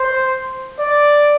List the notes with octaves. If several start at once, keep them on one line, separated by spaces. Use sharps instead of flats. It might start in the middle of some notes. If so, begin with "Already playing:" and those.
Already playing: C5
D5